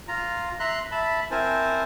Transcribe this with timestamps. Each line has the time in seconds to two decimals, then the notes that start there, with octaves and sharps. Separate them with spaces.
0.08 F4 A#5
0.60 E5 A#5 C6 F#6
0.92 E5 A5 B5
1.31 C4 E4 A#4 C5 G#5 A5